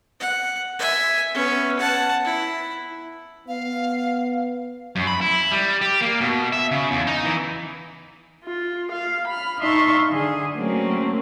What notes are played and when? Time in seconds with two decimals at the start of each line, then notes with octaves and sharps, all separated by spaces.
0.20 F#5
0.79 E5 G#5
1.34 B3 C#4
1.79 F#5 A5
2.24 E4
3.48 B3 F5
4.96 F#2
5.07 B5
5.21 E4
5.51 G3
5.81 G4
6.01 A#3
6.21 B2
6.53 E5
6.71 C#3
6.91 E2
7.07 D#4
7.25 E3
8.44 F4
8.91 F5
9.27 B5 F6
9.60 D#4 E5 F5 A5 C6 C#6
10.08 D3 G#4
10.55 F#3 A3 A#3 C4 C#4